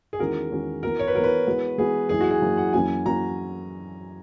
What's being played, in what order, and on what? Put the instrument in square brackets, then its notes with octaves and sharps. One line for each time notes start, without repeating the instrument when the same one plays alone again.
[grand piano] G#4
[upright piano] E2 D#3 G#3 C#4 F#4 [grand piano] A#4
[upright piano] E2 D#3 G#3 C#4 F#4
[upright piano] E3 B3 F#4 [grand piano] A#4
[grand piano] C#5
B4
[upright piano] E3 B3 F#4 [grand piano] A#4
[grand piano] B4
[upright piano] E3 G#3 B3 F#4
[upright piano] E3 G#3 B3 F#4 [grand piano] G#4
[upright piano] F#2 E3 A#3 E4 [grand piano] G#4
[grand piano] F#4
G#4
[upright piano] F#2 E3 A#3 E4
[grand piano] F#5
[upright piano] F#2 E3 A#3 C#4 F#4 [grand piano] G#5
[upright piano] E3 A#3 C#4 F#4 [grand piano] A#5